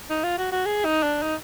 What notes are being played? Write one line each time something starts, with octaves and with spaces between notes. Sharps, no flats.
D#4
F4
F#4
F#4
G#4
D#4
D4
D#4